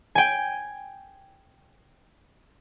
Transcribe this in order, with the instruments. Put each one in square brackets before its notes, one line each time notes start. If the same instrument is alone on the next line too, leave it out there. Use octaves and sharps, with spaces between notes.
[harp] G5 G#5